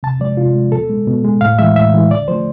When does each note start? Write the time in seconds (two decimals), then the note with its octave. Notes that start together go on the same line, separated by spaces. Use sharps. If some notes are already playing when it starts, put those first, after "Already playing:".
0.03 C3 A5
0.20 F3 G#3 D5
0.37 C3 F4
0.55 F3 G#3
0.72 B2 A4
0.90 G#3
1.07 B2
1.24 G#3
1.41 A2 F5
1.59 E3 G#3 E5
1.76 A2 E5
1.94 E3 G#3
2.11 D3 D5
2.28 F3 A3 C5